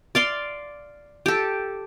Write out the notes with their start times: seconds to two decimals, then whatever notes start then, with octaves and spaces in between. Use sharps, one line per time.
0.15 D5 F5 C6
1.26 G4 A4